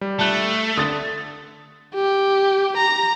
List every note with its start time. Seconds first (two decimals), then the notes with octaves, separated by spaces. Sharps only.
0.01 G3
0.19 A3 A5 F#6
0.77 D3 D#6 A6
1.95 G4
2.77 A#5